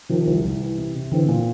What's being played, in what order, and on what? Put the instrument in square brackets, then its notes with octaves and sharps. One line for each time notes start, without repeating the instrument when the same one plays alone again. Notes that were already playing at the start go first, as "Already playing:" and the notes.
[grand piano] C3 [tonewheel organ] D#3 F3
[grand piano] C2
C2
E3
C3
C3
[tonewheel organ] D3 E3 [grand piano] C4
[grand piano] A#2